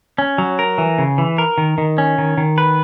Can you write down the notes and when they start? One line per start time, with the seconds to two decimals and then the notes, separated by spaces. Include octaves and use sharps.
0.18 C#4
0.38 F#3
0.59 A#4
0.78 E3
0.98 C#3
1.18 E3
1.38 A#4
1.58 D#3
1.78 D#3
1.98 C#4
2.18 D#3
2.38 D#3
2.58 B4